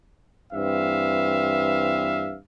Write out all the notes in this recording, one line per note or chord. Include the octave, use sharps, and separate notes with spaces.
G2 E3 C4 E5 F5